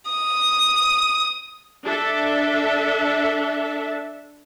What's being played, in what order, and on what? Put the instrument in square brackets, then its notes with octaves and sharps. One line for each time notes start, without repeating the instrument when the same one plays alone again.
[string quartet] D#6
[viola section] D4 A4 E5